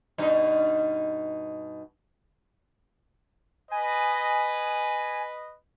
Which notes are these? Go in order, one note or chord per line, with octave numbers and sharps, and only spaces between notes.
G2 B2 D#4
B4 D#5 G#5